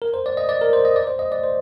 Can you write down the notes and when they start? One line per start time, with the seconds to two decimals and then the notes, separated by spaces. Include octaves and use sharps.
0.02 A#4
0.14 C5
0.26 D5
0.37 D#5
0.49 D5
0.61 A#4
0.73 C5
0.85 D#5
0.96 D5
1.07 C5
1.19 D#5
1.32 D5
1.44 C5